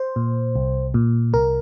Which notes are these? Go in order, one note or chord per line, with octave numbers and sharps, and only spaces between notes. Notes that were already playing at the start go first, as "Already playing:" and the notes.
Already playing: C5
A#2
C2
A#2
C2 A#4